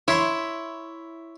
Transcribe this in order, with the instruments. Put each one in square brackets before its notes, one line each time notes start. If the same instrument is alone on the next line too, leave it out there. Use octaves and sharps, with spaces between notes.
[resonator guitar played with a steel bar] E4 [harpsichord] C#5 E5 C6